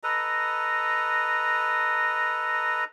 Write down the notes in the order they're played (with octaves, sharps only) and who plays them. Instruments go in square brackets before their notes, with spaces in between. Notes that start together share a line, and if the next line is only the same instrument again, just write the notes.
[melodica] A4 B4 D#5 A#5